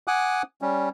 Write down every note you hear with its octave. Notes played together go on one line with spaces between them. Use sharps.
F#5 G#5 D6 D#6 F#6
G3 C#4